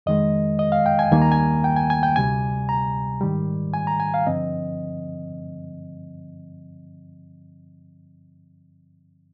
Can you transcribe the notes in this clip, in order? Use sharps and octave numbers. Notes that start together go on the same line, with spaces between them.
F2 D#3 G#3 D#5
D#5
F5
G5
G#5
D#2 D#3 G3 A#3 G#5
A#5
G#5
G5
G#5
G#5
G5
D2 C3 G3 G#5
A#5
G#2 D#3 G3
G#5
A#5
G#5
F5
G2 D3 F3 C4 D#5